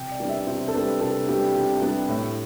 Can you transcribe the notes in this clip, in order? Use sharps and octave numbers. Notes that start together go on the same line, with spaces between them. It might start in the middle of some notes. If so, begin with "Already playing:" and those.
Already playing: C3 G5
D5
G3 B3 D4
E5
C3 C5
A4
G3 B3 D4 B4
C3 A4
G3 B3 D4 G4
C3
G3 B3 D4
A2